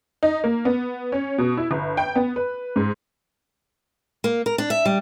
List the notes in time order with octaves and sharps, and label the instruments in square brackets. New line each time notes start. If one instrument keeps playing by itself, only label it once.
[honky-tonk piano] D#4
A#3
B3
C#4
B2
E4
G1
G5
B3
B4
G#2
[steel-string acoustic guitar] A#3
A#4
D4
E5
G3